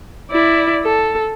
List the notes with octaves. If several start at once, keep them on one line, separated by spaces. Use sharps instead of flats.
E4 D5
A4